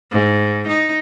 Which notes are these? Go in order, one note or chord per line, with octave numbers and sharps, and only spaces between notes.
G#2
D#4